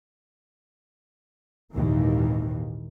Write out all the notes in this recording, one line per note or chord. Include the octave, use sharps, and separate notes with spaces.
G#1 D#2 A#2 D#3 E3 A#3